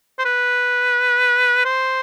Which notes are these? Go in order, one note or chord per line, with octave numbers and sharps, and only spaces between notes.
C5
B4
C5